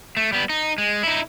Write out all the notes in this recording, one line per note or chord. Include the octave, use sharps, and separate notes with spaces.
A3
G3 B3
D#4
G#3
D#4 E4